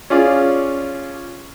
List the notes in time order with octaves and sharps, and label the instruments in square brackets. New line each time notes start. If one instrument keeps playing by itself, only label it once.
[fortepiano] C#4 F4 G#4 D5